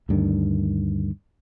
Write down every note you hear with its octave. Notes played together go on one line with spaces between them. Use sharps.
D2 G2 D#3